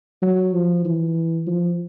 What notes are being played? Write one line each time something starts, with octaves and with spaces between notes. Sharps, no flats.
F#3
F3
E3
F3